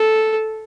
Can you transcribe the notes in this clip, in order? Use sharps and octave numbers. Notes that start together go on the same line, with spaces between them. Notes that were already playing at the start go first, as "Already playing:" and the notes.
Already playing: A4